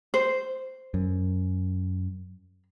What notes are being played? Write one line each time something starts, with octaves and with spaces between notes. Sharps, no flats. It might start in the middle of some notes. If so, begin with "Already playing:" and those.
C5
F#2